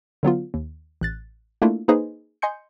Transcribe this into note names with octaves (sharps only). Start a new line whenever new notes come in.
D3 F#3 B3 F4
D#2
A1 F#6 A6
A3 A#3 D4 E4 F4
A#3 D#4 G#4 B4 C5 D#5
D#5 G#5 C6 G6 C#7